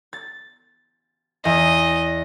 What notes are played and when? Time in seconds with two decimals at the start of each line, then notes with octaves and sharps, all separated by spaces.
0.13 A6
1.45 E2 D#5